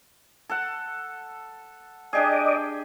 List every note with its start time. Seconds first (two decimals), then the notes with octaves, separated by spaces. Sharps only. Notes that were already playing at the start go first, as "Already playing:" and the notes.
0.49 A4 F#5
2.13 D4 G4 G#4 D5 D#5